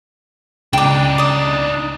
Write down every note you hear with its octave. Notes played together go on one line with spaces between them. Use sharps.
C#2 D4 D#4 G5 D6
D5 D#6